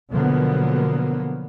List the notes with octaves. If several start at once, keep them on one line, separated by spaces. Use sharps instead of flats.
B2 D3 F3 F#3 A#3 B3